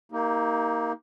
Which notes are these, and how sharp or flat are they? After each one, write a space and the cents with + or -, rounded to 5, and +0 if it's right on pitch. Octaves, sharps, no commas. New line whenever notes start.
A#3 +0 D#4 +30 G4 +0